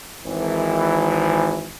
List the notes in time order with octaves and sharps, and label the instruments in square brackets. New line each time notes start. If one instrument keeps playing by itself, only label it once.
[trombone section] G#1 E3